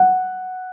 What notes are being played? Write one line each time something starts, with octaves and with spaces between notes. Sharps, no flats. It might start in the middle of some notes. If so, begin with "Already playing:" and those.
Already playing: F#5